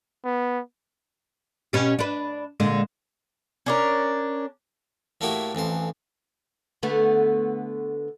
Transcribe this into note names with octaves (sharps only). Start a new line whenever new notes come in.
B3
B2 C#4 G4
D4 B4
A#2 D3 G#3
C#4 D4 A#4
A2 A3 A#3 E4 F#4 G4
A1 F2 E3 C5
D3 A3 B3